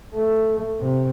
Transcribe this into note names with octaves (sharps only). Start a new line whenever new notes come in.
A3
C3